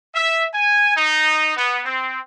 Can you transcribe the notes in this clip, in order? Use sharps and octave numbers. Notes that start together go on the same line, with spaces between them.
E5
G#5
D#4
B3
C4